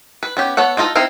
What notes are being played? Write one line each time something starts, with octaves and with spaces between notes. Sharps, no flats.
B4
B3 C#4 G4
B3 A4 C#5 F#5
D4 D#4 F4 A4 D#5
C4 D#4 E4 F5